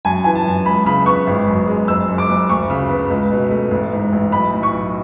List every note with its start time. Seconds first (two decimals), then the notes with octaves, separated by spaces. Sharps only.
0.05 F#2 G#5
0.24 E3 G#5
0.35 A5
0.46 F#2
0.66 C#2 B5
0.86 C#3 B5
1.06 B3 C#6
1.27 G#1
1.47 F#2
1.67 G#3
1.88 F#1 E6
2.08 F#2
2.18 D6
2.29 F#1
2.49 D2 C#6
2.70 C#3
2.89 B3
3.10 C#2
3.31 B2
3.51 A3
3.71 A1
3.92 G#2
4.12 A1
4.32 B1 B5
4.53 A2
4.63 C#6
4.73 B1